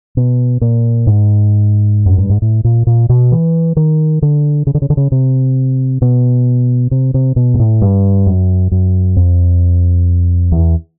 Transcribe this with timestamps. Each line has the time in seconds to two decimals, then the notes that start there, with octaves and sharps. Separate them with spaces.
0.17 B2
0.61 A#2
1.07 G#2
2.06 F#2
2.18 G2
2.30 G#2
2.42 A2
2.64 A#2
2.87 A#2
3.09 B2
3.32 E3
3.76 D#3
4.22 D3
4.67 C#3
4.74 D3
4.82 C#3
4.90 D3
4.97 C#3
5.12 C3
6.02 B2
6.91 C3
7.14 C3
7.36 B2
7.54 G#2
7.59 A2
7.82 G2
8.27 F#2
8.71 F#2
9.16 F2
10.52 E2